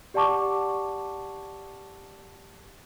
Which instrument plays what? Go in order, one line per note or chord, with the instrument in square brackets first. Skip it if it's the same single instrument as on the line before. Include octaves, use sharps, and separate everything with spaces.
[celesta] G4 D5 F#5 A5 C#6 D6